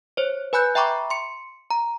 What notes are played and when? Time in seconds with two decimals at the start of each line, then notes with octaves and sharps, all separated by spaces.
0.17 C5 C#5
0.53 B4 G#5 B5 F#6 G6
0.75 E5 G5 A#5 B5 C#6 D6
1.10 C6 C#7
1.71 A#5